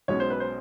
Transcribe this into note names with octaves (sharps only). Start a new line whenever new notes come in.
B1 B2 G#3 C#4 C#5
C5
B4
C5